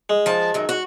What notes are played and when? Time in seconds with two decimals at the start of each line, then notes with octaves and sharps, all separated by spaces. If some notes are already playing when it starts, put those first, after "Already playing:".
0.10 G#3
0.26 F3 A5
0.54 F#2 D#3
0.69 F#4